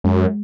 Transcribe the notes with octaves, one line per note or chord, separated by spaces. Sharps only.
F#2 G#3